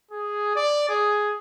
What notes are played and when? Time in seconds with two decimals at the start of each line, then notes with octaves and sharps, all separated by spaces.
0.11 G#4
0.56 D5
0.89 G#4